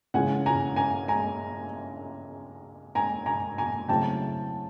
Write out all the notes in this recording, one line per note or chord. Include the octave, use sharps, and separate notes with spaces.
C#3 E3 G#3 C#4 F4 F#5 G#5
G#5 A#5
G#5 A#5
G#5 A#5
G#5 A#5
G#5 A#5
G#5 A#5
C#3 F#3 A3 C4 E4 G5 A5